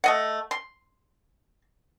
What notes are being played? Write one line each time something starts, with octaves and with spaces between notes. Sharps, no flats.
A3 D#5 F#5
C6